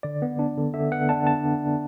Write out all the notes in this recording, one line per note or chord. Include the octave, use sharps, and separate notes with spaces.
D3 D5
B3
D4
D3
D3 E5
B3 F#5
D4 A5
A5